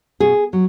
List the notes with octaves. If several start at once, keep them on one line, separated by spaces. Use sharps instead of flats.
B2 G#4
F#3